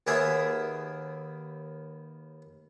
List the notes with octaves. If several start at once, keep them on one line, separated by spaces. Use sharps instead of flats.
D#2 A#3 B3 G#4 E5 D#6